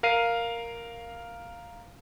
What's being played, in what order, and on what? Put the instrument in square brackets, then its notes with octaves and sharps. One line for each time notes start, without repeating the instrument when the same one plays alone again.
[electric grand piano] A#4 F5 C7 D#7